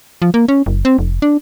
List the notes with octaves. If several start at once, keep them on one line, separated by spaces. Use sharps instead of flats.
F3
A#3
C#4
F#1
C4
F1
D4